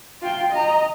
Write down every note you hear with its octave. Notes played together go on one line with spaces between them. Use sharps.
F4 G5
D#5 A#5